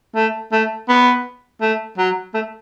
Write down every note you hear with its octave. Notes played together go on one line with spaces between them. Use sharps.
A3
A3
B3
A3
F#3
A3